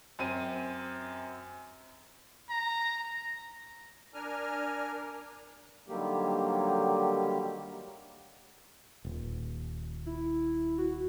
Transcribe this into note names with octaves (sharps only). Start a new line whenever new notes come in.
F#2 C4 D#7
A#5
D4 A#4 G#5 F6
D3 D#3 F#3 G3 A#3 G4
D#1
E4
F#4